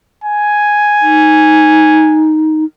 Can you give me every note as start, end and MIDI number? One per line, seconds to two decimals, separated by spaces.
0.24 2.33 80
1.02 2.65 63